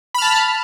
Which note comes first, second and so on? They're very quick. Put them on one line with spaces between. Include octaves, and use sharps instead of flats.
B5 F6 A5